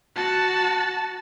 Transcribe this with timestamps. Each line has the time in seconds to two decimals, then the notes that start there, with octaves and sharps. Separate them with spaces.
0.16 F#4 A5